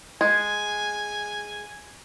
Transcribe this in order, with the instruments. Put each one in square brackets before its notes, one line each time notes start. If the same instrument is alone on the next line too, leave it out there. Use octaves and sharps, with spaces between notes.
[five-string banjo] G#3 [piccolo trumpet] G#5 [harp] G#6